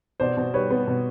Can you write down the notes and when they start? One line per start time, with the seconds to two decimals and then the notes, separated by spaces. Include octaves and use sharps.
0.20 B2 C5 D5
0.37 B2
0.54 G3 B4 C#5
0.70 B3
0.87 B2